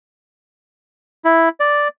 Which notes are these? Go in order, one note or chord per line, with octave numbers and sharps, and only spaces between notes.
E4
D5